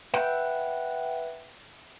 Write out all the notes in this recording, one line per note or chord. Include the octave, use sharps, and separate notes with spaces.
B4 E5 F#5 G5